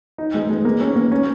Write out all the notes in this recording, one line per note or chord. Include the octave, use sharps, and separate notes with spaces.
D#4
G#3
G#3
A#3
C#4
A#3
C#4